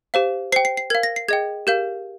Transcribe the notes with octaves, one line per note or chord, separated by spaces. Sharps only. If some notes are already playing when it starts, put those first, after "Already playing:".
G4 C5 F5
C5 G5 C7
C7
C7
A#4 F5 G#6
A#6
C7
G#4 D#5 G5 G#6
G4 A#4 F5 G6